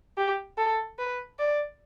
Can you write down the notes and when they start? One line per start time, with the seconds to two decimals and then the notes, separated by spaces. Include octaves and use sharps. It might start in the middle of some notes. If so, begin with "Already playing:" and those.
0.18 G4
0.58 A4
0.99 B4
1.39 D5